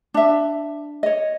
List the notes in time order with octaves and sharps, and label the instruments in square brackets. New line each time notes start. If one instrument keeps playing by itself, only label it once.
[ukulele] D4 E5
C#5 D#5